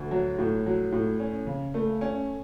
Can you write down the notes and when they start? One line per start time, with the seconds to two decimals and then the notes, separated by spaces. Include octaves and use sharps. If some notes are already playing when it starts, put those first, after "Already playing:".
Already playing: D2
0.11 F#3
0.39 A2
0.66 F#3
0.92 A2
1.20 C#4
1.47 C#3
1.74 A3
2.01 C#4